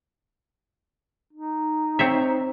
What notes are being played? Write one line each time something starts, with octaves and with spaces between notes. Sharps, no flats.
D#4
C4 C#5 E5